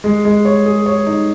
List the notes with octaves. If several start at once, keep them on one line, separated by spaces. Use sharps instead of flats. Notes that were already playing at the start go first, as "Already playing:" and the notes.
G#3
G#3
C#5
G#4
C#5
D#4